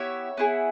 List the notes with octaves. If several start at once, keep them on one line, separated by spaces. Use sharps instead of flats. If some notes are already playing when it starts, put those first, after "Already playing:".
Already playing: B3 E4 G4 C#5 E5
B3 E4 G#4